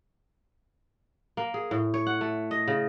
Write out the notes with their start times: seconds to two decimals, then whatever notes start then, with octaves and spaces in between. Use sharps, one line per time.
1.37 A#3
1.54 G#4
1.71 A2
1.94 C#5
2.07 F#5
2.21 A3
2.51 D#5
2.68 C#3